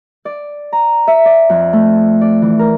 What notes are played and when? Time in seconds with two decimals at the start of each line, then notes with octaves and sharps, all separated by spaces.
0.25 D5
0.72 A#5
1.07 E5
1.25 D5
1.50 F2
1.73 A3
2.21 D5
2.42 E3
2.59 A#4